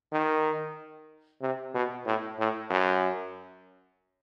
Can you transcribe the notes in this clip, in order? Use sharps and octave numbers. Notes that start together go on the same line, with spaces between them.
D#3
C3
B2
A2
A2
F#2